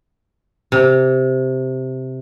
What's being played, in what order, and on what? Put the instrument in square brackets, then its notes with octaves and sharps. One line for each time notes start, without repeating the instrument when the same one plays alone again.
[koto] C3